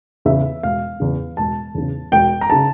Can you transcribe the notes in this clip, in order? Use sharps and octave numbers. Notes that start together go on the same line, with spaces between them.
E2 C#3 E5
E1 F5
E2 C#3
E1 A5
E2 C#3
E1 G5
A#5
C#3 A5